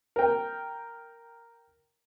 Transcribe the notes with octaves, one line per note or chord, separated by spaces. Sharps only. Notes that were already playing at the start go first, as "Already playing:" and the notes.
A#4 G5